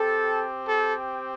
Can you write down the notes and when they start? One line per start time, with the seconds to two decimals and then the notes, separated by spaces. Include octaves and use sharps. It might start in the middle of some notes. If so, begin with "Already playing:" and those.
Already playing: C4 G4 A4
0.68 A4